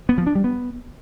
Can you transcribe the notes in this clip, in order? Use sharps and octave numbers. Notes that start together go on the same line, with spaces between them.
B3
F3
D4
G3
B3